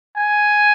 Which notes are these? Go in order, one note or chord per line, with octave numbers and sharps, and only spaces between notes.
G#5